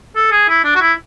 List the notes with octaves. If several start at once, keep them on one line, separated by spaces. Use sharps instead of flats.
A4
G#4
E4
D4
F#4
E4